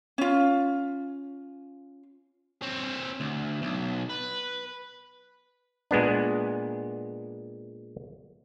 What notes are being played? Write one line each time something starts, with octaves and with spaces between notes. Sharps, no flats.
C#4 F4
C4 C#5
D2
B1
B4
A#2 G#3 B3 D4